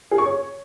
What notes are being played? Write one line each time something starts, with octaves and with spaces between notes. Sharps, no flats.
G#4
C#6
C#5